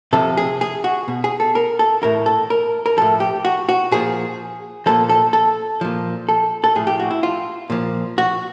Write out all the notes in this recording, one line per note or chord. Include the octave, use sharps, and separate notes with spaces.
C3 F3 A4
G#4
G#4
F#4
B2
G#4
A4
A#4
A4
A2 E3 A#4
A4
A#4
A#4
A2 F3 A4
G4
F#4
F#4
A#2 F3 G#4
A#2 F3 A4
A4
A4
A#2 F3
A4
A4
A2 F3 G#4
G4
F#4
E4
F4
A#2 F3
F#4